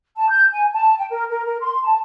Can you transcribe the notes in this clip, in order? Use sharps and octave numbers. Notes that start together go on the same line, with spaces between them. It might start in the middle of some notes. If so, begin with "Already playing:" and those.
A5
G6
G#5
A5
G5
A#4
A#4
A#4
C6
A5